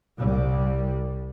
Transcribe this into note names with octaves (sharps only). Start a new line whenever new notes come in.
C2 G3